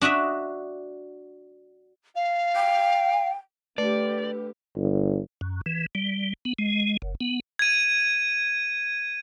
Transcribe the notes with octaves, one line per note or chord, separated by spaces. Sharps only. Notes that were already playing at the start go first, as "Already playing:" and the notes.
D4 F#4 D#5 E5
F5
G5
D3 A3 G4 B4 D5
G1
F#2
E3
G3
B3
G#3
F#1
B3
G#6 D#7